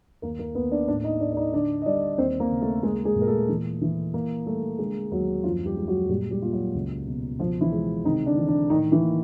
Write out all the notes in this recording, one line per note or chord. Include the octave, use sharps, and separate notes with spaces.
D#2 A#3 A#4
A#3 A#4
D#2 B3 B4
D4 D5
A2 D4 D5
D#4 D#5
A2 D4 D5
D5
D#4 D#5
D3 D4 D5
D#5
G3 D4 D5
D#2 C4 C5
A#3 A#4
C#3
A3 A4
G#3 A#3 G#4
G#3 G#4
A#2
A#4
A3 A4
E3
E3
A#3 A#4
G3 A3 A4
D3 G#3 G#4
D#2 F#3 F#4
F#2 F3 F4
G3 G4
G#3
F#3 F#4
A#2 G3 G4
G3 G4
A#3 F4
F#3 F#4
C#2
B2
B2 F3 F4
E3 E4
G#3
C3 D#3 D#4
D3 D4
E3
D3 D4
A2 D#3 D#4
E3 E4
A#3